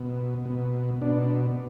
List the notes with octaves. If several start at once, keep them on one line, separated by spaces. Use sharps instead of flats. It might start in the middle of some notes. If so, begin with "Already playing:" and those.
Already playing: B2
B2
B2 D4